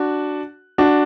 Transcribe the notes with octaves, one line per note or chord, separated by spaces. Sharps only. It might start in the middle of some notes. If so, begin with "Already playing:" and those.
Already playing: D4 F#4
D4 F#4